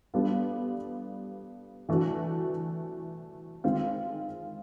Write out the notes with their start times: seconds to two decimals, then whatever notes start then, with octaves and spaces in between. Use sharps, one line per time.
0.14 G3 B3 D4 F4 A4
1.89 E3 A3 D4 F#4
3.64 D#3 G#3 C4 F4